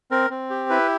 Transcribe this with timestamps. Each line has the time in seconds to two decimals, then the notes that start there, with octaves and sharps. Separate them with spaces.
0.11 C4 A#4
0.30 C4
0.50 G4
0.69 E4 B4